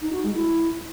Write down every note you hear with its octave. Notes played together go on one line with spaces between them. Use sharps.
D#4
F#4
G#3
E4